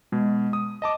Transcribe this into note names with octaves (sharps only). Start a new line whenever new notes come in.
B2 G#3
D#6
D#5 A5 D6